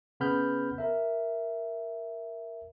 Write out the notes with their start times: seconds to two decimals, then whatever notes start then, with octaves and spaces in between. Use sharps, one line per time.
0.20 C#3 B3 B5 F6 G6
0.78 A#4 E5